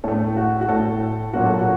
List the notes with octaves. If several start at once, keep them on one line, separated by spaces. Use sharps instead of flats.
A2 A3 A4
F#4
F#4
A2 A3 A4
A#2 F#3 A#3 F#4
A4
F#4